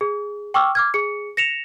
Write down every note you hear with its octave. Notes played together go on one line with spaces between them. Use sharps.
G#4
G5 C#6 D6 E6 F6
D6 F6 G#6
G#4 C#7
A#6 C#7 E7 F7